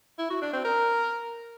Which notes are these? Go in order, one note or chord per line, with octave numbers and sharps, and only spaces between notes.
E4
F#4
D4
C4
A#4